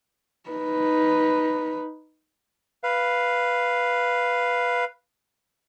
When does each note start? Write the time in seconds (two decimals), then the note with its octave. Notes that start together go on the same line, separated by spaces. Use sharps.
0.49 D#4 B4
2.84 B4 F5